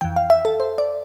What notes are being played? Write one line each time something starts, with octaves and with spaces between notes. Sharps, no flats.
F2 E3 G5
F5
E5
A4
C5
D5